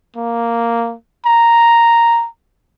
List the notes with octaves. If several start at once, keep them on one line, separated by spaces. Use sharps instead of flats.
A#3
A#5